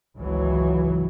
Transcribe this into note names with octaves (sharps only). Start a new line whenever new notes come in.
G#1 C#2 E3 F#3